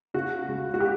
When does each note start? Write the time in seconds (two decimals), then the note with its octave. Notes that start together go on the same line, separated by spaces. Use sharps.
0.14 C#3 F#4
0.48 C#2
0.74 F#4
0.80 G4